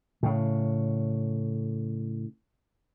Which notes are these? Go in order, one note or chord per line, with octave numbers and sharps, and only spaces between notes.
A2 C#3